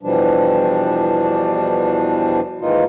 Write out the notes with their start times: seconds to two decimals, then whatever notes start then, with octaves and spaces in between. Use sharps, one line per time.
0.03 E2 B2 E3 F3 G3 D4
2.61 G#2 D#3 E3 A#3 D#4 F4